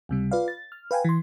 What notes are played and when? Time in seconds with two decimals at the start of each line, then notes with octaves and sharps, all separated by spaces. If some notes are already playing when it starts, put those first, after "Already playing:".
0.09 C#2 C3 G3
0.31 F4 B4 D5 F5
0.48 A6
0.72 F6
0.91 B4 F5 G5 G#5
1.05 E3 C6